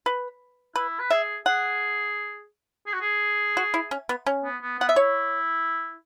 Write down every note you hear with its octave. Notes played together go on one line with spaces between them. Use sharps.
B4
E4 B4
B4
G#4 E5
G#4 F#5
G#4
F#4
G#4
F#4
E4
C#4
B3
C#4
B3
B3
B3 F#5
E5
E4 C#5